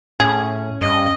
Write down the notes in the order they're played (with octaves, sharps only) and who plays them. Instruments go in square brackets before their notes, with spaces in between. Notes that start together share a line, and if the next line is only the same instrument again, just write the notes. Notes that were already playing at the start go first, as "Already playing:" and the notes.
[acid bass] A2 [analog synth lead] C#4 [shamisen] G#4
[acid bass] G2 [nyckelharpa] D#5